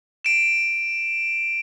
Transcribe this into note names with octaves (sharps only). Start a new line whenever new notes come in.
D7 E7